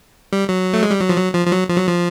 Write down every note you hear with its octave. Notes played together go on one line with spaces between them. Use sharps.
G3
F#3
A3
G#3
G3
F#3
F3
F#3
F3
F3
F#3
F3
F#3
F3